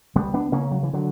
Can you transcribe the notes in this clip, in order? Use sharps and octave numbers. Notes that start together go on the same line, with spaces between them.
C#2 G3 B3
B3 D4
C#3 A#3 C#4
F#3
E3
D3 F#3